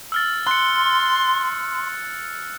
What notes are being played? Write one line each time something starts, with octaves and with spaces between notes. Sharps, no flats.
E6 F6 A6
C6 F#6 C#7